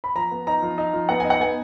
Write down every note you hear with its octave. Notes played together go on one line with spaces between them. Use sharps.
B5
F3 A#5
B3
D#4 A#5
F3
D#4
F3
B3 F#5
D#4 G#5
F#5
B3 G#5